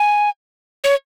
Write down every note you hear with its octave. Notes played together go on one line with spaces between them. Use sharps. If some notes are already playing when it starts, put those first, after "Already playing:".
Already playing: G#5
C#5